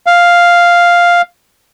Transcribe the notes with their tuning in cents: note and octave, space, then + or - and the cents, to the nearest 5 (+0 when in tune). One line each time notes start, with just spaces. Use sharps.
F5 +0